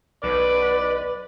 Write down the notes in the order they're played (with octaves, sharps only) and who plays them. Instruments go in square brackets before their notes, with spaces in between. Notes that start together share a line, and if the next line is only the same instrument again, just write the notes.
[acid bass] B1 [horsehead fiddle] B4 [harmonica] D5